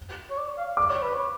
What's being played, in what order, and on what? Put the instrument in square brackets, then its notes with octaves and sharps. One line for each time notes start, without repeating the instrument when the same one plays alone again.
[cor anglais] C#5
D5
F5
[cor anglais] D5 [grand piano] D6
[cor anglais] C#5
B4
C#5